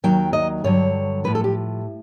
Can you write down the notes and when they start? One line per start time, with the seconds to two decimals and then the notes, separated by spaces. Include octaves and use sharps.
0.04 D#2 D#3 F#3 G5
0.33 D#5
0.64 G2 D3 F#3 C#5
1.24 A2 F3 B4
1.35 A4
1.44 G4